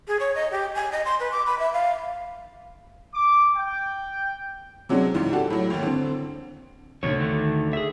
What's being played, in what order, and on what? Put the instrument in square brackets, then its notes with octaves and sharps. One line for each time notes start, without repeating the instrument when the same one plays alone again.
[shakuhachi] G#4
C#5
D#5
G4
G#5
D#5
C6
B4
D6
B5
E5
F5
[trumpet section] D6
G5
[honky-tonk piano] C3 F#3 G#3 C#4 D4
C#2 G#2 E3
D4 F#4 G4 A4
A2 F#3
G#1 D#2
D3 C4
[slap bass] D2 [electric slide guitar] A#2 C#3 C#5
[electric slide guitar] D3 D#3
G#4 E5